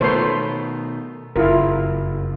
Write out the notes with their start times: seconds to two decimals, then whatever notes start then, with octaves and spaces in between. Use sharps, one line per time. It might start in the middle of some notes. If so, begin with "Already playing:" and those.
0.01 B2 D#3 A3 B3 C5 C#5 C6
1.36 F#1 F2 E4 F4 A#4